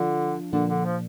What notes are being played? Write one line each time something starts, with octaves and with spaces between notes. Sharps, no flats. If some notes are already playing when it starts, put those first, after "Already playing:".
Already playing: D3 F3 D4 F4
A#2 D3 F3 A#3 D4
D3
F3